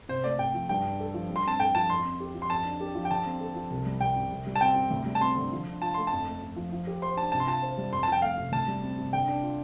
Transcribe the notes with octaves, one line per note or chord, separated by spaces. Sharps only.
C3 C5
A3 D5
C3 G5
F3
G2 G5
D4
A4
F3
G2
C6
C4 A5
A4 G5
F3 A5
F2 C6
C4
G4
F3
C6
F2 A5
D4
G4
F3
G5
D3 A5
C4
A4
F3
C2
G3
C2 G5
C3
C2
G3
A5
C4 G5
C3
D2
G3
A5
C4 C6
D3
F3
D4
F4 A5
A3 C6
F2 A5
A3
F2
F3
F3
G4
C5 C6
D4 A5
C3 A5
C6
F4 A5
C5
G3
F2 C6
A5
F3 G5
A3 F5
C3
D2 A5
G3
C4
C3
D3 G5
D4
F4